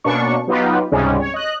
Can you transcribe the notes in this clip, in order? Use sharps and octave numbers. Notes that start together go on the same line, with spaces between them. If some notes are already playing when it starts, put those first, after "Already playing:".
B2 A#3 C#4 D4 C#6
F#3 B3 D#4 F4 G4 B4
C#2 G#2 C3 G3 G#3 C#4
C#5
D#5 F#6